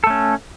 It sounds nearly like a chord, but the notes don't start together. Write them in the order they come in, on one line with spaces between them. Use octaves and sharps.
A4 A3 C#4